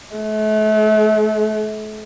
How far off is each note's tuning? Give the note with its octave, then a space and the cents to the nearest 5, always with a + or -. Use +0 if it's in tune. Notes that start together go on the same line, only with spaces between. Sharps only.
A3 -40